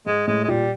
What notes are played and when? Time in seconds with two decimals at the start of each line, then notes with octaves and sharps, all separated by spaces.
0.06 G#2 G#3
0.27 A2 G#3
0.44 G#3
0.48 A#2 G3